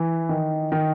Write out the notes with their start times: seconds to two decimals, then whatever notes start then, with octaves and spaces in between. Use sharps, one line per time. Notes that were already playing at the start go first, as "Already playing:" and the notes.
Already playing: E3
0.29 D#3
0.72 D#3